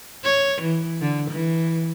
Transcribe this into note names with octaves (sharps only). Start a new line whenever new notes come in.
C#5
E3
D3
E3